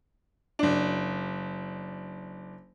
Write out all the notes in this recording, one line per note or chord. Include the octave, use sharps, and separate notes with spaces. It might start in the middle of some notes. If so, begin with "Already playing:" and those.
F#1 D4